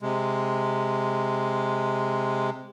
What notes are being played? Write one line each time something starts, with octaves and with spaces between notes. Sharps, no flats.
C3 G#3